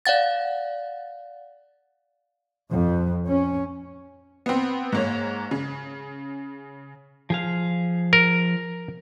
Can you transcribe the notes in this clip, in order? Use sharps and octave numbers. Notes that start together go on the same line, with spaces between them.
D5 F5 F#5 A6
F2
C#4
B3 C4
G#2 A#3 C#5
C#3
F3 G#4 F5
A#4